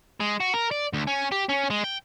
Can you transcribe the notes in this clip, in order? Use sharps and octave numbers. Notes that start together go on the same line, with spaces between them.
G#3
F#4
A#4
D5
D2
C#4
G4
C#4
G#3
G5